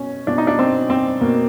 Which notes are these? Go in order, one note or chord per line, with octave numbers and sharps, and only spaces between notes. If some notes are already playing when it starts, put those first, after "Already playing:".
Already playing: B2 C#4
B2 D4
D#4
D4
C4
C4
B2 A#3